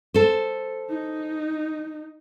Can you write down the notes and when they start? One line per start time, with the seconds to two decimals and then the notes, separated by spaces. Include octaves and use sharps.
0.14 A4 C5
0.90 D#4